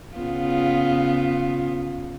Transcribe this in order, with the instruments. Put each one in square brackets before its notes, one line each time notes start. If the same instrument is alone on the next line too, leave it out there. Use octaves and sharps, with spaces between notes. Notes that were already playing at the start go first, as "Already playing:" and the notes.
[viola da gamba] C#3 B3 F4